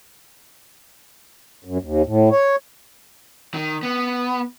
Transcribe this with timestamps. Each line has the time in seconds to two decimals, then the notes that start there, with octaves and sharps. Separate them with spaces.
1.65 F#2
1.81 D#2
2.06 A2
2.30 C#5
3.54 D#3
3.83 B3